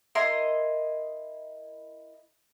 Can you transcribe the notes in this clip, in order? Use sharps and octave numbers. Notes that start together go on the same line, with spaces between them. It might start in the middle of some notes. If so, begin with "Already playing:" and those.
E4 A#4 D#5 C6